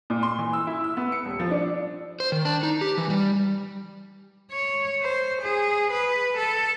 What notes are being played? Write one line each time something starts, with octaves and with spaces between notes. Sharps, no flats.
A#2
C6
E3
E6
E4
E6
B3
C#7
D#1
F3
D4
C5
D#3
D4
D#4
G4
E3
G3
C#5
C5
G#4
B4
A4